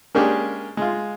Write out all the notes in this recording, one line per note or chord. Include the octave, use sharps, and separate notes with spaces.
G#3 A#3 C#4 D4 G4 G#4
G#3 F4